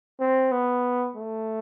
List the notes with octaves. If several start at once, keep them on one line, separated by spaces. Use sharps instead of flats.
C4
B3
A3